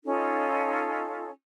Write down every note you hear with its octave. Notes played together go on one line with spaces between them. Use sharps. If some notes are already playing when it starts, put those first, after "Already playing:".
C#4 D#4 F4 A4